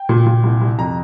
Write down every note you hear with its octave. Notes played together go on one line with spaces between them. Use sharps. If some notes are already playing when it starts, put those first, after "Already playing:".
Already playing: G5
A#2
A#2
C2
C2
F2 A#5